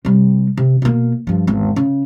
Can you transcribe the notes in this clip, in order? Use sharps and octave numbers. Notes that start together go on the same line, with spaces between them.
C3 G3
C3
B2 A#3
G2 F3
G#1 E2
C#3